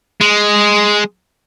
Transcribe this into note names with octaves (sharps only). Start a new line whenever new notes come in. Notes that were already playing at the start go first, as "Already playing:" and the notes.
G#3